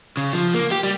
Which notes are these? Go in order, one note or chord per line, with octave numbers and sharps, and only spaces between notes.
C#3
F3
A#3
G4
G3